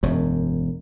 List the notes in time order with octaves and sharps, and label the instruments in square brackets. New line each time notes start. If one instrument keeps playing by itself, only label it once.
[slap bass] E1 F#2